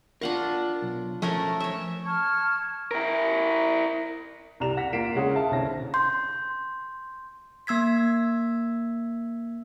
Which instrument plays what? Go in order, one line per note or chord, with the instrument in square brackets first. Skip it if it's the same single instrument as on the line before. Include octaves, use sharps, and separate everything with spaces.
[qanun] D4 F4 C#6 [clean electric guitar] A#4 F5 F#5
[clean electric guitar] B1
[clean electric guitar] F3 [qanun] A3 C#4 A#4
[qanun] C#5 E5
[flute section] A5 C#6 F6 G#6
[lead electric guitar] E4 A#4
[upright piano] C2 G4 D5 A#5 E7 F7
F#5 A#6 B6
A#3 F4 B6 C7 D7 E7
C#3 G#3 C#4 F#5 D#6
E5 F5 A5
C2 D3 C#4 C5 A#6
[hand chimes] C6 G6
A#3 E6 G#6 B6